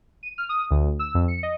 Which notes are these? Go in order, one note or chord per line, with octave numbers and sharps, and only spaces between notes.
D#7
F6
D#6
D2
E6
F2
C#7
D#5